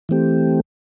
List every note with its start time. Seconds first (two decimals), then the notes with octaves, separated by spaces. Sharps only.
0.09 E3 A3 C4 G4